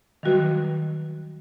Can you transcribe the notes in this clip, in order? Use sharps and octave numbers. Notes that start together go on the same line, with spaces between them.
D#3 F#3 G3 F#4 B4